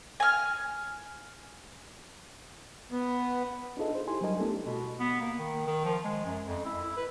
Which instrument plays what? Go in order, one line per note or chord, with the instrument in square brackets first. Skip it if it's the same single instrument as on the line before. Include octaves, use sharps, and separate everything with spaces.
[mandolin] G#5 F6
[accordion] B3
[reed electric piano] D4 D#4 F4 G#4 A4 D#5
C5
D#4 E4 G4 G#5 C6
F#3 G3 D4 A#4 D#5 G#5
A3 B3 D4 E4 G4 A4
[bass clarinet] B2
B3
A#3
D#3
D#3
F3
G#3
F#2
F2
E4
E4
B4